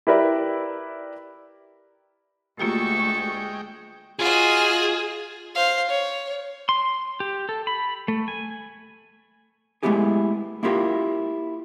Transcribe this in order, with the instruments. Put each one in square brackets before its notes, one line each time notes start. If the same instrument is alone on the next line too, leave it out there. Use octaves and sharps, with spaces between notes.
[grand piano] E4 G4 A#4 B4 D5 E5
[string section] D2 C#6 [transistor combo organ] G#3 G5 [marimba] A#3 F4 G4 [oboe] A4
[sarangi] F4 [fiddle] F#4 D#5 [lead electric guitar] G#4
[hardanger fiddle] C5 F5
C#5
[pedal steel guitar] C6
G4
A4
B5
A3
G#5
[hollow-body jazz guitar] G#3 A3 B3 E4 G4 G#4
A#3 E4 F4 G4 A#4